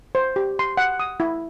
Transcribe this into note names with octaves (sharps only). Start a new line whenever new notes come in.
C5
G4
C6
F#5
D#6
E4